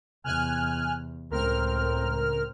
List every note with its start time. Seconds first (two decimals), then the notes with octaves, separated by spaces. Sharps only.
0.24 E2 C3 G#5 F6 F#6
1.30 C#2 A2 C4 A#4 F6